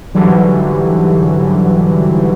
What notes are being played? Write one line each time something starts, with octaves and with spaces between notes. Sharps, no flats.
G#2 D3 E3 F#3 G3